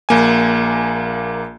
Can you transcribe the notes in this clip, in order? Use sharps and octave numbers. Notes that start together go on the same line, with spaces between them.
A#1 A#3 G#5